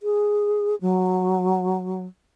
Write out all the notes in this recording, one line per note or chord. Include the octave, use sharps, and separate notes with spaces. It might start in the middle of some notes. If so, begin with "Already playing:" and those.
G#4
F#3